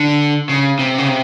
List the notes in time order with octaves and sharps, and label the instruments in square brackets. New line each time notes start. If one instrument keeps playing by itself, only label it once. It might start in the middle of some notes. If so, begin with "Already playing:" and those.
Already playing: [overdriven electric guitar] D3
C#3
C3
C#3
C3